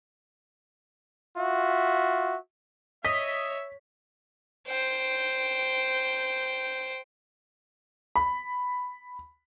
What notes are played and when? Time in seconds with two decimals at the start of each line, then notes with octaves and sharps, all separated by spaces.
1.36 F4 F#4 E5
3.05 C#5 D#5 E5 B6
4.68 C5 G5
8.16 B5